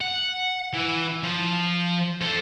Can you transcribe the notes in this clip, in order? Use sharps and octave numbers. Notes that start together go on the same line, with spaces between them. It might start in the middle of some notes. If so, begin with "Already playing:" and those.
F#5
E3
F3
A4 C5